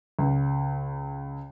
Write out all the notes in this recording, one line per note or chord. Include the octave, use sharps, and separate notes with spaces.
C#2